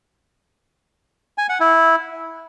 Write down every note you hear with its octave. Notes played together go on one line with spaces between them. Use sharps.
G#5
F#5
E4